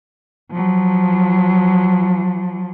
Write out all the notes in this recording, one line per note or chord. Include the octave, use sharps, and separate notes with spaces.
F3 F#3